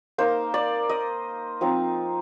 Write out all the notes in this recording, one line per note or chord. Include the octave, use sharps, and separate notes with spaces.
A#3 D#4 C5
D5
D#5
F3 C4 D#4